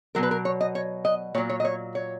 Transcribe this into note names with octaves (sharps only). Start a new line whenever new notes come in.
B2 F#3 A#4
B4
A#4
C#5
D#5
C#5
D#5
A#2 F#3 C#5
C#5
D#5
C#5
C#5